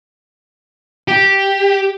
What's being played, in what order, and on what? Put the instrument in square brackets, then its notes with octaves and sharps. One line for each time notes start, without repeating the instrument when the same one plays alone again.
[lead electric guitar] G4